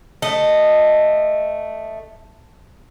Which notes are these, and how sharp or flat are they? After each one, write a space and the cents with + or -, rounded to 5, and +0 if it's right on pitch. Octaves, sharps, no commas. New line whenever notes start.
A3 +0 D#5 -15